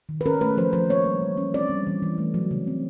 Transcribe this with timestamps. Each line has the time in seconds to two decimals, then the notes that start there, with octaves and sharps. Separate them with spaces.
0.09 D#3
0.21 B4
0.26 C#4 A#4
0.41 A3 B4
0.57 F3 C5
0.73 F3 C5
0.90 A#3 C#5
1.06 G3
1.21 E3
1.37 C#4
1.54 C4 D5
1.70 G3
1.87 E3
2.02 E3
2.18 A3
2.34 F#3
2.51 C#3
2.67 C4